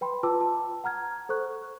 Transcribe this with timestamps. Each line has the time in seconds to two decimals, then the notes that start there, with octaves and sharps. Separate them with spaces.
0.01 B4 G5 B5 C6
0.23 F4 B4 G5 A5 D6 E6
0.41 A5
0.84 F#5 A#5 F6 G#6
1.29 A4 C5 C#6 F#6